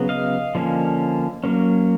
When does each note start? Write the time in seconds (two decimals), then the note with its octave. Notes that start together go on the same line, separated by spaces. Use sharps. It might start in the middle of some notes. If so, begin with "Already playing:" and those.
Already playing: C#3 F#3 B3
0.09 D#5 F5
0.55 D3 F3 A#3 C#4
1.44 F#3 A#3 C#4